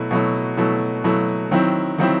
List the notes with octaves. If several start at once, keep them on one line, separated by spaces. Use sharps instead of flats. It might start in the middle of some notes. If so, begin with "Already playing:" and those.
Already playing: B2 F#3 A3 E4
B2 F#3 A3 E4
B2 F#3 A3 E4
B2 F#3 A3 E4
D#3 F#3 C4 E4
D#3 F#3 C4 E4